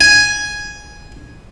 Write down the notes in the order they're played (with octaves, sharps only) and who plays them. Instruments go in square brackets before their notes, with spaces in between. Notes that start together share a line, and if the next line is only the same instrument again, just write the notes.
[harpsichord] G#5